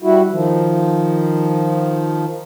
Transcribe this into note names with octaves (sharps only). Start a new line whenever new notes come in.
G3 E4 F#4
D#3 F3